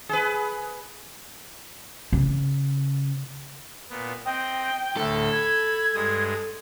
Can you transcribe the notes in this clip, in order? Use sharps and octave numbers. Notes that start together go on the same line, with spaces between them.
G#4 B4
C#3
A#2 B3
C4 D#5 G5
D2 A2 D3 A4
B5 G#6
G2 G#3 D#6